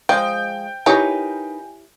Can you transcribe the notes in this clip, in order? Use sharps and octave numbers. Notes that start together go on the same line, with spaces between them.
F3 G#3 D#5 G5
D#4 E4 G4 A#4 B4 C#5 G#5